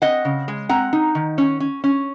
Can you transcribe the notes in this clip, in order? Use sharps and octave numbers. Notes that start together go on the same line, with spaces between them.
C4 D#5 F#5
C#3
G#3
C4 F#5 A#5
D#4
D#3
C#4
C#4
C#4